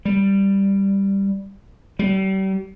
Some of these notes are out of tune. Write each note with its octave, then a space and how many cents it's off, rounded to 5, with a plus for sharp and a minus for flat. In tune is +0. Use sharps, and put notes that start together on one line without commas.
G3 +5
G3 -35